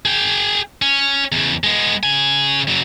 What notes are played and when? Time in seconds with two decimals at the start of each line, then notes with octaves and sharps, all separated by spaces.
0.05 G#4 G5
0.82 C#4
1.32 E2 C#3
1.64 G#3 B3
2.03 C#3 G#5
2.68 C#3 F#3